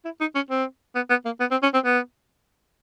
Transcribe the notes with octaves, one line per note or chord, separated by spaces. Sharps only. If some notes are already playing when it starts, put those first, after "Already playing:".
E4
D#4
C#4
C4
B3
B3
A#3
B3
C4
C#4
C4
B3